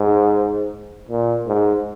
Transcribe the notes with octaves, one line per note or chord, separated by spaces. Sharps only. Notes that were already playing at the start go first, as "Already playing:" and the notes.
Already playing: G#2
A#2
G#2